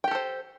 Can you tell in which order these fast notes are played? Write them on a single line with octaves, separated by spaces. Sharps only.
G5 G4 A4 C5